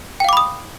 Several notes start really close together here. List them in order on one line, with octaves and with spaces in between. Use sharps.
G5 F5 D6 B5 D#6